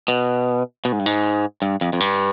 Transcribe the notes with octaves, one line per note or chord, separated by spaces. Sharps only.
B2
B2
G#2
G2
G#2
G2
F2
F2
G2